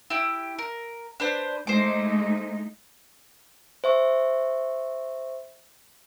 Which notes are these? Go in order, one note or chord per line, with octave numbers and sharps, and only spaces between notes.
E4 G4
A#4
D4 B4 C5
G#3 A3 D#4 C5 D6
C5 E5 C#6